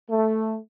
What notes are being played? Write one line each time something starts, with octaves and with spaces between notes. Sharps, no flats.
A3